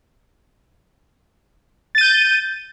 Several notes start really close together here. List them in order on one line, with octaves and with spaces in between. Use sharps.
A6 D#7 G6